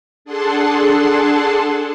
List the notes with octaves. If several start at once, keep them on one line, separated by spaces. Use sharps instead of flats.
D4 G#4 A4 F#5 A5 C6